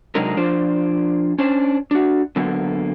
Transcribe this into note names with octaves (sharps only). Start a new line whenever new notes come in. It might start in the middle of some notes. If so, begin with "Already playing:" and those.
C3 F#3 G#3 D4 D#4 A#4
F3 D4 F4 C5 D5
C#4 D4 C5 D5
D4 F#4
D3 F#3 A#3 B3